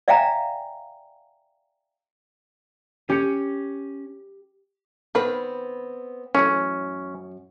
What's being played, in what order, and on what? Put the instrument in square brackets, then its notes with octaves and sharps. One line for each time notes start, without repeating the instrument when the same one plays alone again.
[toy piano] D5 E5 F5 G5 G#5 A#5
[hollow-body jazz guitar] C#4 [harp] G4 C#7
[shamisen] D#3 B4 [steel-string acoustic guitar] B3 C4
[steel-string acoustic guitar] F#2 [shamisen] E3 A3 [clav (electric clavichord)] C#4